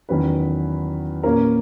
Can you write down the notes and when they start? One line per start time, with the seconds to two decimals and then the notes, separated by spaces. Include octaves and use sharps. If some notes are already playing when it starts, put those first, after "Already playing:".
0.09 E2 D#3 F#3 C#4 B4
1.23 A#2 A#3 C#4 A#4